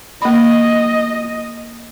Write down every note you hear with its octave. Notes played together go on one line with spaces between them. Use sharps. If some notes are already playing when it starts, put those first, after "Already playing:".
A#3 D#5 B5